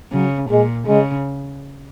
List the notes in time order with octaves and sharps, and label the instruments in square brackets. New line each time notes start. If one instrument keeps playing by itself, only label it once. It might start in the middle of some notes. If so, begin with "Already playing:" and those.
[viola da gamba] C#3 [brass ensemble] F#3
[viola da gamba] A#2 [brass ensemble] G#3
[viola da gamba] C#3 [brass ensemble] G#3